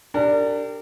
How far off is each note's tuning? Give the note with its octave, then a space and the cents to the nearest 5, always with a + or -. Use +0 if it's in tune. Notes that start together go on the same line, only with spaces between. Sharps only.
D4 +0 G4 +0 A#4 -35